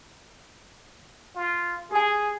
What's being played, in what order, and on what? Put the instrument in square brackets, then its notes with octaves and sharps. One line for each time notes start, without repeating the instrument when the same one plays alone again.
[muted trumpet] F4
[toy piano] G4 G#5 [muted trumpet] G#4